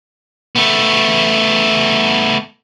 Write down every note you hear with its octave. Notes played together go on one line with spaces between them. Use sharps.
A3 B3